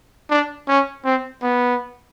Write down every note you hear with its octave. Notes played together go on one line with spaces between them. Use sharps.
D4
C#4
C4
B3